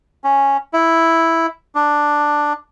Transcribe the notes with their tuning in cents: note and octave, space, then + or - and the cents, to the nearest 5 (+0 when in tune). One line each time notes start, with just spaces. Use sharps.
C#4 -5
E4 +0
D4 +5